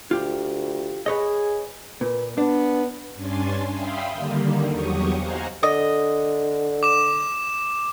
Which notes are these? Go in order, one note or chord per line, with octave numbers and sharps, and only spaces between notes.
D2 F4 G4
G#4 B4 C#5 D#5
A#2 B4
B3 D4
G2 C#4 D4 G#5 C6 A6
E5 F5 G5 B5 C6 D#6
D3 D#3 G3 A#3
E2 F#3 G4 C#6 D#6
C5 D#5 F5 F#5 G#5 A#5
D3 D#5
D6 E7